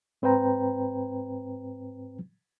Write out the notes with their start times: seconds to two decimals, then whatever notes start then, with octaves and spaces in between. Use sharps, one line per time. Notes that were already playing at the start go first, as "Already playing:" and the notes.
0.22 G#2 C4 B4 C5 G5 A#5